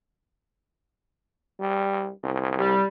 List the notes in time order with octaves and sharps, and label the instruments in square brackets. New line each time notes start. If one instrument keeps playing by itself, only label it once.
[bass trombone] G3
C2
[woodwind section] G3